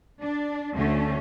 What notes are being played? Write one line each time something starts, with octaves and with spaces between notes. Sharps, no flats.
D4
D2 D3 A3 C#4